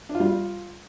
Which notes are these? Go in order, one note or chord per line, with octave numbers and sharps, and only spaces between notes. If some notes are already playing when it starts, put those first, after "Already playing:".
D4
F4
G3
F4